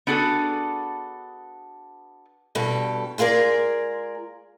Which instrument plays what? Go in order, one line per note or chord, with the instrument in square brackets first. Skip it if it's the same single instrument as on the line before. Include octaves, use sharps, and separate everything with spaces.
[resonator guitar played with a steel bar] B3 D4 F#4 G#4 A4
[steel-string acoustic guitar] G2 B2 G3 A4
G#3 F4 G#4 A#4 D5